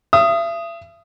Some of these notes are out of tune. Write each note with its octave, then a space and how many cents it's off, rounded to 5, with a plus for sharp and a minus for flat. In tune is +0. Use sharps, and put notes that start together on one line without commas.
E5 +40 D#6 +0